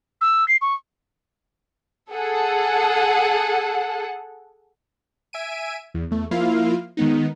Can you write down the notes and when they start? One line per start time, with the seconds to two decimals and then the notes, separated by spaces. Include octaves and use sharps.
0.21 E6
0.48 C7
0.61 C#6
2.13 G#4 A4 F#5
5.33 E5 G#5 D7 D#7
5.94 E2
6.11 E2 A3
6.31 F3 A#3 E4 F4 F5
6.97 D#3 G#3 B3 D#4